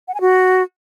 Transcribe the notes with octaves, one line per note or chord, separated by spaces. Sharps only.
F#5
G#5
F#4